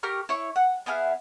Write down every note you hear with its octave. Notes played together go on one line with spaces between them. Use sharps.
G4 A#4 C#6 F6
E4 C#5 C#6
F#5
B3 E4 G#4 F5